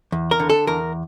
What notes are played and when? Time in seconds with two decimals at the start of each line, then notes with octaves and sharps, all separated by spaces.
0.12 E2
0.31 A#4
0.40 D3
0.50 A4
0.67 E2 A#4